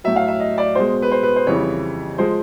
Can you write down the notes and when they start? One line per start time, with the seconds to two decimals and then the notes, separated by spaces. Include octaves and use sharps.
0.04 A2 F#3 E5
0.16 F5
0.28 E5
0.40 D#5
0.58 D5
0.75 B2 G#3 C5
1.02 B4
1.11 C5
1.23 B4
1.36 C5
1.47 F2 C#3 E3 G3 C#5
2.18 F3 G#3 C5